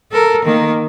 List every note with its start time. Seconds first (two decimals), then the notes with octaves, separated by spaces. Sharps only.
0.12 A4 A#4
0.45 D#3 A#3